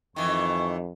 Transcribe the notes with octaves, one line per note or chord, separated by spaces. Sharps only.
F2 D#3 E3 C#6